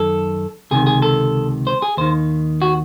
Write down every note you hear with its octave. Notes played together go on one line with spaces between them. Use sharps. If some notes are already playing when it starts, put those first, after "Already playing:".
Already playing: F#2 D#3 A4
C#2 C3 D#3 G#4
G#4
A4
C5
G#4
D#2 D#3 C5
F#4